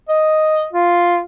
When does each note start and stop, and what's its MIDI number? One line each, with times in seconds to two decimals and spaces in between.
0.09 0.68 75
0.73 1.20 65